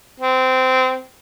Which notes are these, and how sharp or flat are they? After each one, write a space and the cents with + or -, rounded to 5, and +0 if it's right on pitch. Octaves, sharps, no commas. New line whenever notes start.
C4 -20